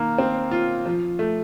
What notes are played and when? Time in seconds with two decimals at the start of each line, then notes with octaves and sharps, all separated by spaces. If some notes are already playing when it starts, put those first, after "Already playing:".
Already playing: D#3 A#3
0.18 C4
0.51 F4
0.86 F3
1.19 A3